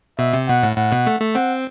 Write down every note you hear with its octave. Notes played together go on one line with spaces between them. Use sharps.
B2 E5
C3
B2 F#5
A2
A2 F#5
B2
A3
A3
C4 F#5